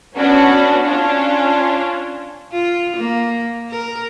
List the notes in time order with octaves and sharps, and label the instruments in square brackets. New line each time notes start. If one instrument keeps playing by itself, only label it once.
[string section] B3 C#4 D4 F#4
C#4 D4 F4
[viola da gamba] F4
A#3
A#4